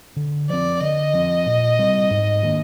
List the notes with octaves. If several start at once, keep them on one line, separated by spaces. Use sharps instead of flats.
D3
F3 C4 D5
D3 D#5
F3 C4
A#2
G3 C4
G#2
D#3 A#3 D4